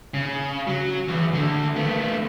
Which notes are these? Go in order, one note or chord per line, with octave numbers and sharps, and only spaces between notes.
C#3
F#3
E2
D2 D3
A3 B3